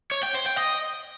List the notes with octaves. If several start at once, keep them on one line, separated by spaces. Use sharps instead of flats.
C#5
G5
C5
G5
D#5